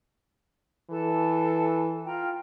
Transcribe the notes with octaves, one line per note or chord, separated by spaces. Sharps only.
E3 A4 A5
F4 G5 A#5